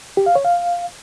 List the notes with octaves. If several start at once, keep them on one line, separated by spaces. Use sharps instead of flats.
G4
F5
C#5
F5